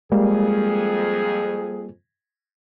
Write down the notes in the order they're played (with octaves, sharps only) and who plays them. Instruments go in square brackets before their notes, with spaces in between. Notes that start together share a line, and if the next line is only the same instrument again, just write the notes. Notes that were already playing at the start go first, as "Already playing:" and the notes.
[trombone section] F2 G#4 [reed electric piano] G3 A#3 [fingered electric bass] G#3